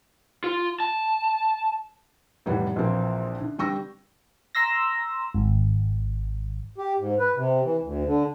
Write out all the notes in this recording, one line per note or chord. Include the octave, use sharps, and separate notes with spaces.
F4
A5
F1 A2 D#3 E3 G3 F#5
A#1 A#2 E3 F3 A#3 C4
D3
D3 G3 G5 C#6 E6 A#6
A#5 C6 E6 A#6
G#1
G4
G#2
B4
C3
E3
D2
D3